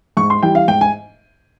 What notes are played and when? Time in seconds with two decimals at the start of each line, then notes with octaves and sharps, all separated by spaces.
0.17 G#2 C#6
0.30 C6
0.42 E3 G3 G5
0.55 F5
0.68 G#2 G5
0.81 G#5